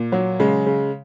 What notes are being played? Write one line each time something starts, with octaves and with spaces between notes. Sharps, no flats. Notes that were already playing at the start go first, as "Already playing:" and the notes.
Already playing: A#2
F#3
C#3 G#3
C#3